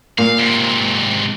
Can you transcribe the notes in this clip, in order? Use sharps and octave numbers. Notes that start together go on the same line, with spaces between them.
A#2 F5
G#2 C3